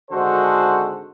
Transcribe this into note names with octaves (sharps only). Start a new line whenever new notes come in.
G#1 D3 G#3 F#4 A4 C5